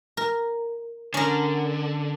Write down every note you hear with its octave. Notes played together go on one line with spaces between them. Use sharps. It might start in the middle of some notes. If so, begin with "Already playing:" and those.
A#4
D3 C#4 A#4